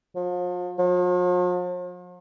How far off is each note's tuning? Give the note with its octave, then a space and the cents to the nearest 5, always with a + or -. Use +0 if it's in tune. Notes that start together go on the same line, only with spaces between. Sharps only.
F3 +40
F3 +45